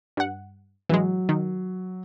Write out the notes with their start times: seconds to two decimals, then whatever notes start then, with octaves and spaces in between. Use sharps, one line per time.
0.17 G2 F#5
0.89 E3 F#3 G#3
1.29 D#3